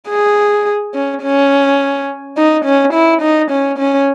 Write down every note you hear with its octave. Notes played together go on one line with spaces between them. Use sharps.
G#4
C#4
C#4
D#4
C#4
E4
D#4
C#4
C#4